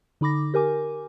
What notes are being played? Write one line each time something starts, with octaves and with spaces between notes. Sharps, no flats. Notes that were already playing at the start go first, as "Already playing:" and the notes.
D3 D#4 B5 D6 A#6
G4 A#4 G#5 D6